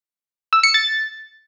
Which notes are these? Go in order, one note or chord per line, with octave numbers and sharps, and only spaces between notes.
E6
C#7
A6